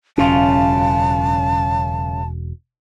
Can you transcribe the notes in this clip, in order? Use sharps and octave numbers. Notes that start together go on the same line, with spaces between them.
E1 F#2 C#3 C#4 F4 A5